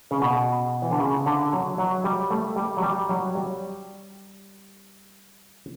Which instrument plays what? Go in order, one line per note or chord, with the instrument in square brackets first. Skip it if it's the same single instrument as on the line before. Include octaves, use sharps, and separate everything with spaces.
[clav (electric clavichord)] C#3
B2
E3
D3
C#3
D3
F#3
F#3
G3
A3
G3
F#3
G3
F#3
G3